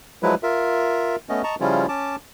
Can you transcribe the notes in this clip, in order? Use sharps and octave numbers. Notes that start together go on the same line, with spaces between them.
F3 F#3 G#3 E4 B4
F4 A#4 E5
A3 B3 C#4 D#5
D#5 A5 A#5 C#6
C#3 F3 G3 C#4 E4 F4
C#4 A5 D6